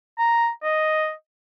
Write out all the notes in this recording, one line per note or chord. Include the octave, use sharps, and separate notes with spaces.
A#5
D#5